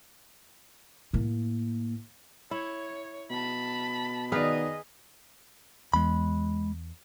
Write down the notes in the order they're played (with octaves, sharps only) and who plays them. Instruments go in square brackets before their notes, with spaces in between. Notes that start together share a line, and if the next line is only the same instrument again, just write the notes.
[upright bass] A2 A#3
[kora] E4 [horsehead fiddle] C#5
[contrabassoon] B2 [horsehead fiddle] A5 B5
[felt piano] D#3 B3 D5 [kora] G#4 B4 F5 [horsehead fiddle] D#5
[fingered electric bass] E2 [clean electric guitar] G#3 B5